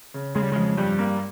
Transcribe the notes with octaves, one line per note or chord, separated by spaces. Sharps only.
C#3
C#3 G#3
G3
F2 G#3
G2 G3
A#3